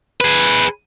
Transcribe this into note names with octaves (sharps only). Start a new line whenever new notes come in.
G#4 B4